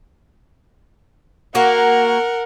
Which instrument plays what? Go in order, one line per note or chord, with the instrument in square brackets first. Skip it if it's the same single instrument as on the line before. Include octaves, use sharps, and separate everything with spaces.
[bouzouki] A#3 F#4 [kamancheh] A#4 F#5